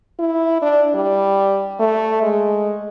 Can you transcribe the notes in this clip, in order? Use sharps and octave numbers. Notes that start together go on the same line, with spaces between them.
E4
D4
G3
A3
G#3